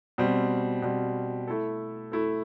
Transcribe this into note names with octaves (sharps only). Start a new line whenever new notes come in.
B2 G3 C4
B2 G3 C4
A3 E4 A4
A3 E4 A4